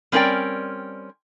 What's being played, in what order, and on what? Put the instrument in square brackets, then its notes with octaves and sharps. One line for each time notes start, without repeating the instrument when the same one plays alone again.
[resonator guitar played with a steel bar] G3 C4 C#4 A#4 D5 G5